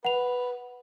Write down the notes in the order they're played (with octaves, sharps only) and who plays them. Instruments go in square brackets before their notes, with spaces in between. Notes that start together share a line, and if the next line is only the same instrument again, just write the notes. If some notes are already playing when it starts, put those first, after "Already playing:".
[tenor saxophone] B4 [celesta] F#5 F7